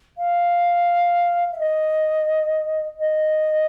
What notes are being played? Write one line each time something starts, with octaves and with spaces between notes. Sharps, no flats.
F5
E5
D#5
D#5